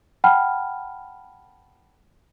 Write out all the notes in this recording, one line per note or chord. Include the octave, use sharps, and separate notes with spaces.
F#5 G5 A5 B5 F6